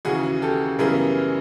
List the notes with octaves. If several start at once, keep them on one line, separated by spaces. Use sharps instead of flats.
D#2 C#3 E3 F#4 G#4
G4 A4
F#2 C#3 E3 G3 B3 G#4 A#4